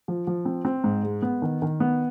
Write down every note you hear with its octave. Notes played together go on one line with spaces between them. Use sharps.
F3
F3
C4
C4
G#2
G#3
B3
D#3
D#3
B3